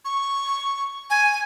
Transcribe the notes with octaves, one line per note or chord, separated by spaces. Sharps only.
C#6
G#5